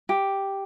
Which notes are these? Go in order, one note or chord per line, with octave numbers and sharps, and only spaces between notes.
G4